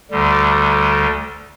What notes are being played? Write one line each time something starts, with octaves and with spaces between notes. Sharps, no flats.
D2 D3 G3